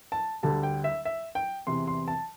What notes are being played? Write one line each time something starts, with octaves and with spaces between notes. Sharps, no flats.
A5
D2 D3 G3 A5
G5
E5
E5
G5
E2 C3 E3 C6
C6
A5